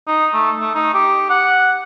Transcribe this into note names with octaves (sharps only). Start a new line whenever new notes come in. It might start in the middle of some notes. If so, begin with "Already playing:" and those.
D#4
A3
A3
D#4
G4
F#5